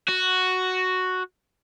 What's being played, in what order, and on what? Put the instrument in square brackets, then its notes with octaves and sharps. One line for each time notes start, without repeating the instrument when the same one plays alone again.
[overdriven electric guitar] F#4